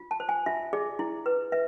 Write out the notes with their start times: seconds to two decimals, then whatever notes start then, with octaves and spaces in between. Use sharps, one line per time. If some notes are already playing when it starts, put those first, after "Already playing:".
Already playing: F4
0.11 A5
0.20 C5
0.29 G#5
0.46 F4 E5
0.73 G#4 D5
0.99 E4
1.26 B4
1.52 B4 E5